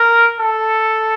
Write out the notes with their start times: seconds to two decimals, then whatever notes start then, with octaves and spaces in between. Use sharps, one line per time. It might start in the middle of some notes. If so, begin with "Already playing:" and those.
Already playing: A#4
0.40 A4